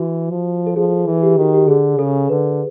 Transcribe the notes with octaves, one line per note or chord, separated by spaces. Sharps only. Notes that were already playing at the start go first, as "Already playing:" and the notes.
Already playing: E3 F#4
F3
A4
F3 G#4
E3
G4
D#3 F#4
G4
D3 G#4
C#3 A4
D3 B4